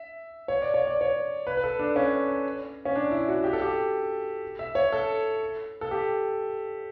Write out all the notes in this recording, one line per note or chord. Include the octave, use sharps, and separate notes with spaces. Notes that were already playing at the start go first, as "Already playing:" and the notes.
Already playing: E5
C#5
D5
C#5
D5
C#5
B4
B4
A4
D4
C#4
C#4
D4
E4
F#4
G4
A4
G4
E5
C#5
A4
A4
G4